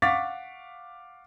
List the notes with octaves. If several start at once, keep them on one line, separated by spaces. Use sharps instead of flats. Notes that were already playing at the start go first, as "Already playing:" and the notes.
F5 F#5 C#6 D6 A6 B6